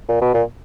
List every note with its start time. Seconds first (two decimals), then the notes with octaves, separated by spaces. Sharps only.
0.08 A#2
0.21 B2
0.34 A#2